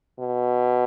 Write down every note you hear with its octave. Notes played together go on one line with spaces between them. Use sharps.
B2